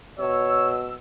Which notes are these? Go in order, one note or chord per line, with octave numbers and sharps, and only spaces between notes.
B2 C#5 E6